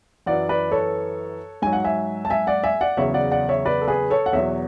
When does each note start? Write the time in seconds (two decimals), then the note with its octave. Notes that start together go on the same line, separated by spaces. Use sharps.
0.26 F#2 E3 D5 F#5
0.49 B4 D5
0.72 A4 C#5
1.62 G#2 F#3 G#5
1.73 F#5
1.84 E5 G#5
2.25 A5
2.30 E5 G#5
2.47 D5 F#5
2.64 E5 G#5
2.81 D5 F#5
2.97 E2 C#3 F#3 C#5 E5
3.14 D5 F#5
3.32 D5 F#5
3.49 C#5 E5
3.66 B4 D5
3.81 A4
3.88 G#4 B4
4.10 A4 C#5
4.26 F#5
4.33 E2 B2 F#3 C#5 E5